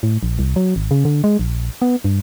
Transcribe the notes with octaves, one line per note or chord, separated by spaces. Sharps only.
A2
A#1
C2
F#3
G#1
C#3
D3
G#3
A#1
B3
G2